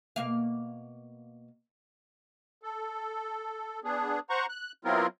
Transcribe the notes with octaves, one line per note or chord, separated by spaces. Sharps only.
B2 A#3 F5
A4
B3 D4 G#4
C5 F#5 A#5 C#6
F#6
F#3 B3 C4 E4 F4 A#4